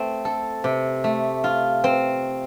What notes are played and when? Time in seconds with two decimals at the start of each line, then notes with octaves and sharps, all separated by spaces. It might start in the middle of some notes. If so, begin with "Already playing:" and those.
Already playing: A3 C4
0.25 A4
0.64 C3
1.04 A3
1.44 F4
1.84 C4